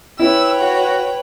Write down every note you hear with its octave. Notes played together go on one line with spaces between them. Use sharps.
E4 B4 C#5 G5 B5 E6
F#4